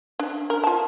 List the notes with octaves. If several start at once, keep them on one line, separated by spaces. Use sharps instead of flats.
D4
A#4
F4 A5